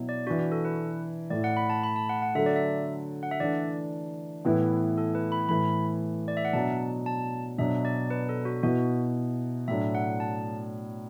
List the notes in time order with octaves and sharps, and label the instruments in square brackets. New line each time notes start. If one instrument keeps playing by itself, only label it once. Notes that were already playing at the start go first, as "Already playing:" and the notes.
Already playing: [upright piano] B2 F#3 B3 E4
[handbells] D5
[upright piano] D4 [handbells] F#4
[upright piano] E3
[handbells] F#4
A4
B4
[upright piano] A2 A3 E4 [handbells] D5
[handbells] F#5
B5
A5
B5
A5
F#5
F#5
[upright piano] D3 F#3 A3 [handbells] E5
[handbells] D5
E5
F#5
E5
[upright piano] E3 A3 D4 [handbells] D5
[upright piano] A2 E3 B3 E4
[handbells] A4
B4
B5
[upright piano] A2 E3 A3 [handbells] B5
[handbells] D5
E5
F#5
[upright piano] B2 F#3 D4 [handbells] A5
[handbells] A5
[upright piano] B2 F#3 D4 [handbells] E5
[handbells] D5
B4
A4
F#4
[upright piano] B2 B3 E4 [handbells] F#4
[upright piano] A2 F#3 D4 [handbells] E5
[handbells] F#5
A5